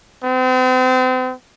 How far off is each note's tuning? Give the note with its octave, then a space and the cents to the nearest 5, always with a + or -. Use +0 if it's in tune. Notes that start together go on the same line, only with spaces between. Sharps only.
C4 -40